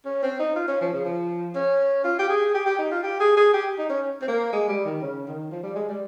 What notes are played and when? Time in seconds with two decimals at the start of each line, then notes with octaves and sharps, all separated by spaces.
0.05 C#4
0.23 C4
0.39 D#4
0.56 F4
0.68 C#4
0.81 F3
0.93 C#3
1.05 F3
1.55 C#4
2.04 F4
2.19 G4
2.29 G#4
2.55 G4
2.66 G4
2.79 D#4
2.91 F4
3.03 G4
3.20 G#4
3.37 G#4
3.53 G4
3.78 D#4
3.90 C#4
4.22 C4
4.28 A#3
4.53 G#3
4.68 G3
4.85 D#3
5.02 C#3
5.27 D#3
5.51 F3
5.63 G3
5.76 G#3
5.89 G3